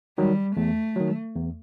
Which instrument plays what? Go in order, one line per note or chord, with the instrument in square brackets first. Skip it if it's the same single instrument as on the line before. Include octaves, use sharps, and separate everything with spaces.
[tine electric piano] D#3 F#3 [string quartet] G3
[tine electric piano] E2 [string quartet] A3
[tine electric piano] D#3 F#3
E2